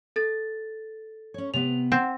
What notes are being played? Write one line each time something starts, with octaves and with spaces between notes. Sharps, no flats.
A4 A6
C#4 C#5
C3 B3 F7
C4 F#5